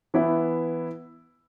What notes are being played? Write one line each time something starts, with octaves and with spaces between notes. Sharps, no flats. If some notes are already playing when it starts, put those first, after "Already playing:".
E3 B3 E4